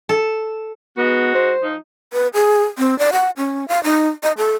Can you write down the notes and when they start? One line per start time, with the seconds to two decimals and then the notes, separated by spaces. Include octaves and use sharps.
0.09 A4
0.97 G#3 B3 D#4 F#4
1.35 C5
1.63 F3 D#4
2.13 B4
2.34 G#4
2.78 C4
2.99 D5
3.13 F#5
3.37 C#4
3.68 F5
3.84 D#4
4.23 D#5
4.38 A4